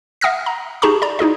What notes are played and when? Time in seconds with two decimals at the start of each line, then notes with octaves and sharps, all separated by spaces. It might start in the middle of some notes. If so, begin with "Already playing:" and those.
0.21 E5 F#5 D#6 F6 A#6
0.46 A#5
0.82 D#4 G4 G#4 A5 A#5 C#6
1.02 D5 A#5
1.19 D#4 E4 G#4 D#5